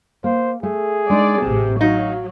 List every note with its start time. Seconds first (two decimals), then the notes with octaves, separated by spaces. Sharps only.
0.24 A#3 C5
0.63 A3 G#4
1.10 G#3 D4 D#4 D5
1.42 A1 C3 A5
1.81 F#3 D#4 F5